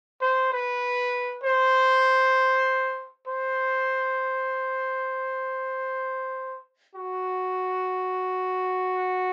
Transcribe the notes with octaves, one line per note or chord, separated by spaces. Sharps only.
C5
B4
C5
C5
F#4